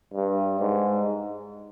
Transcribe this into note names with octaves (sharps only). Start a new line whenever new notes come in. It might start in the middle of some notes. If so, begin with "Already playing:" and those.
G2
G#2